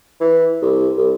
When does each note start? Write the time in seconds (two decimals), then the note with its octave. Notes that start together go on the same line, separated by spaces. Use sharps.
0.20 E3
0.62 C2
0.97 C2